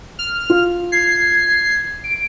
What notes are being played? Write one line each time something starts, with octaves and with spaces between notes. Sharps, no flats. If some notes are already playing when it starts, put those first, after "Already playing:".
F6
F4
G#6 C7
D7